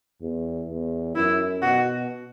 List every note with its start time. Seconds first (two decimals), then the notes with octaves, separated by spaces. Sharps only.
0.22 E2
0.69 E2
1.16 F#2 E4
1.63 B2 F#4